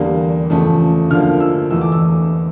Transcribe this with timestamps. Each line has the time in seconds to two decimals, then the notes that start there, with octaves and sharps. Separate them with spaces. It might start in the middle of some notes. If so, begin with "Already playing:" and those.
Already playing: E2 D3 G3 A#3
0.50 E2 C#3 F3 A3
1.10 D2 D3 F3 A#3 F6
1.40 E6
1.70 E2 E3 A3 E6
1.81 D6
1.92 E6